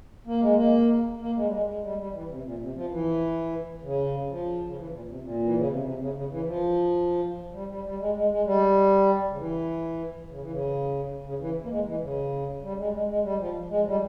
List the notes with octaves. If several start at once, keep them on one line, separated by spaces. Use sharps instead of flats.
A#3
G#3
A#3
A#3
G#3
G3
G#3
G#3
G3
G3
E3
C3
A#2
C3
F3
E3
C#3
F3
C#3
E3
A#2
C3
A#2
E3
C#3
C3
C3
C#3
C#3
E3
F3
G3
G3
G3
G#3
G#3
G#3
G3
C#3
E3
C#3
E3
C#3
C#3
E3
A#3
G#3
E3
C#3
G3
G#3
G3
G#3
G#3
G3
F3
G#3
F3
G3